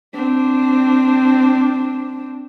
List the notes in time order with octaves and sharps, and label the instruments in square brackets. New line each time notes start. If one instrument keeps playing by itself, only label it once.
[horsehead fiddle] C4 D4